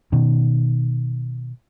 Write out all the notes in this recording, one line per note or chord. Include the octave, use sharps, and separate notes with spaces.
B2 D#3